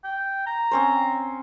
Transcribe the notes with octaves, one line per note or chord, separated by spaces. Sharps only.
G5
A#5
C4 C#4 C5